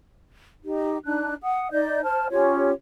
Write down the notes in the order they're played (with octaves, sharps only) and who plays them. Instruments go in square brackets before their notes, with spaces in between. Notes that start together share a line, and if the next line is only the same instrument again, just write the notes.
[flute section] D#4 G4
D4 D#4 F#6
F#5 D#6
D#4 D5 D#5 G6
C5 A5 F6
C#4 F4 G4 C#5